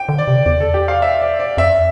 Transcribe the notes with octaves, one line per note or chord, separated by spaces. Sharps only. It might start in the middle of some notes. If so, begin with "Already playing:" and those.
Already playing: G5
D3
D5
C3
E2 D5
A4
G4
F5
E5
D5
D5
F2 E5